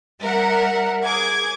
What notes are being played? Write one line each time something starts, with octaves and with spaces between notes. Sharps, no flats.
G3 A#4 E5 F#5
G#4 D6 G#6